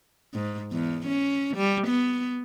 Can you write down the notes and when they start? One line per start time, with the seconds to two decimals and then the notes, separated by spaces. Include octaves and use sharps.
0.34 G#2
0.72 E2
1.07 C#4
1.57 G3
1.88 B3